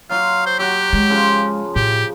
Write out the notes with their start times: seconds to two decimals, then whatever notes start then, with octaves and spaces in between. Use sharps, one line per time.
0.10 F#3 F5 C6
0.46 C5
0.59 F#3 F#4 G4
0.93 G#3
1.10 C#3 F3
1.76 A2 G4